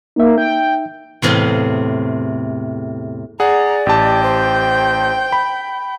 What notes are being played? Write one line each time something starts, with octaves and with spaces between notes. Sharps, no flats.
A#3 D#4 E5
G5
E2 A2 C3 G#4 F5 C6
G#4 D5 F#5 A#5
A1 G4 G5 A5
C5
B5